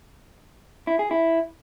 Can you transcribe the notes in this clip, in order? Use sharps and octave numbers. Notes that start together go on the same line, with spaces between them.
E4
G#4
E4